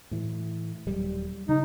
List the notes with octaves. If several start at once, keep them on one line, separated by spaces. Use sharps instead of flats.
A2 E3
D#1 F#3 G3
C#3 D#4